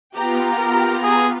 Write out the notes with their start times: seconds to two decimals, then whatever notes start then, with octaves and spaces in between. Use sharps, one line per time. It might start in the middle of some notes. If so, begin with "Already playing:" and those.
0.14 B3 F4 G4 G5 A#5
0.57 A#4
1.03 G#4